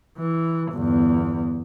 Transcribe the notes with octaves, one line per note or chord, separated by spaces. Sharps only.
E3
G1 E2